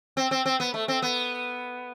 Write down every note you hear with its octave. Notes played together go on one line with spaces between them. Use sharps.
C4
C4
C4
B3
A3
C4
B3